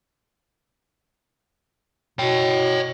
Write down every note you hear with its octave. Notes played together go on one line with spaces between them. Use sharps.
B2 C#5 G5